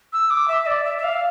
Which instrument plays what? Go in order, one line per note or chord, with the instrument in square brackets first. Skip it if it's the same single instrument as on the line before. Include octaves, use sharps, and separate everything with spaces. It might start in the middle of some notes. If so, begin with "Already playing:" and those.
[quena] E6
D6
E5
D5
E5
E5
F5